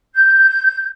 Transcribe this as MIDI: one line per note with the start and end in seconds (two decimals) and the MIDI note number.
0.15 0.86 91